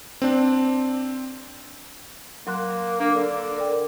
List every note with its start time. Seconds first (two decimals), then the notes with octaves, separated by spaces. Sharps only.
0.22 C4 D4
2.47 F#3 A#3 C6 F#6
3.00 A#3 D4
3.15 D3
3.57 A#4 D5 G5